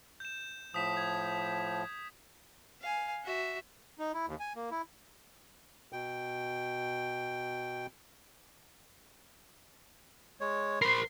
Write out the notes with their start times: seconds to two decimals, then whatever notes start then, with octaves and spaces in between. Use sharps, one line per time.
0.20 G6 E7
0.74 A2 F3 D#6 B6 E7
0.97 G#6
2.81 F5 G#5
3.24 F#4 E5
3.99 D#4
4.14 E4
4.27 D#2
4.40 G#5
4.56 A#3
4.71 E4
5.93 B2 G5
10.40 G#3 C#5
10.82 A#4 C5 B5 C6 C7